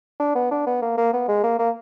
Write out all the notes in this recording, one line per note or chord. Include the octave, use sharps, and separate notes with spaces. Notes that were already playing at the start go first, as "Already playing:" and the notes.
D4
B3
D4
B3
A#3
A#3
B3
G#3
A#3
A#3